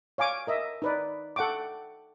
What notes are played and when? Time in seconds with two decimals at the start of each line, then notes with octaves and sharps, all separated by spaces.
0.18 C#5 F5 G#5 D6
0.47 A#4 D#5 E5
0.82 D#4 B4 D5
1.36 A4 F#5 G5 C#6 D6